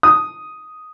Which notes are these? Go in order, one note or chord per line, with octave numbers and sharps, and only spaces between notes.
D#6